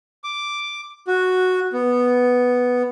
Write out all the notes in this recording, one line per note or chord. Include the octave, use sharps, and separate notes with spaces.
D6
F#4
B3